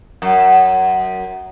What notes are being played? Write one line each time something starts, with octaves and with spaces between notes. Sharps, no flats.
F#2